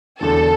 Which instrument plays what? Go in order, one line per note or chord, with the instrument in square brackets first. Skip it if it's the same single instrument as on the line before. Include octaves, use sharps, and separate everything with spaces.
[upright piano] E1 E2 D3 [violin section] A4